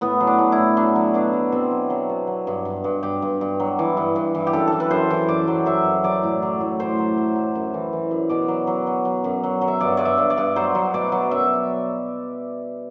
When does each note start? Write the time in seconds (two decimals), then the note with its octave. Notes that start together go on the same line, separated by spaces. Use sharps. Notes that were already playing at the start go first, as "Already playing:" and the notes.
0.01 A2 B3
0.20 F#3
0.27 D4
0.39 A2
0.52 E4
0.58 A2
0.77 F#3 D4
0.96 F#3
1.14 B2 D4
1.33 F#3
1.52 B2 C4
1.71 F#3
1.90 F#3
2.09 B2
2.27 F#3
2.47 G2
2.65 G2
2.84 G2
3.03 G2 G4
3.22 G2
3.41 G2
3.60 F#3
3.79 E3
3.97 G2
4.16 G2
4.35 E3
4.47 G4
4.53 F#2 A4
4.68 E3 A4
4.80 B4
4.91 F#2 C5
5.10 E3
5.28 F#2 D5
5.48 F#3
5.66 F#3 E5
5.85 F#2
6.04 F#3 D5
6.23 A2
6.42 F#3
6.61 A2
6.79 A2 C5
6.98 F#3
7.18 F#3
7.35 F#3
7.55 F#2
7.74 E3
7.93 E3
8.11 F#2
8.29 B2 D5
8.48 F#3
8.67 F#3
8.87 F#3
9.05 F#3
9.24 F#2
9.43 F#3
9.61 F#3
9.68 E5
9.80 G2 D5
9.97 G2 D5
10.05 E5
10.18 G2
10.30 D5
10.37 G2
10.56 F#3 C5
10.75 F#3
10.94 B2 D5
11.12 F#3
11.31 F#2 E5